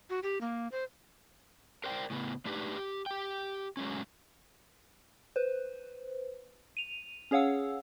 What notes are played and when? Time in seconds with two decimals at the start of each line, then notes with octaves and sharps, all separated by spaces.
0.10 F#4
0.23 G4
0.41 A#3
0.72 C5
1.84 A#4 C5 D5 G5
2.10 A2 C#3 B3
2.45 A3 D4 D#4 G4 G#4 B4
2.77 G4
3.06 G4 G5
3.77 F#3 G#3 A3 C#4
5.36 B4 C5
6.77 D#7 F7
7.31 C#4 G#4 C#5 F5 F#5 E6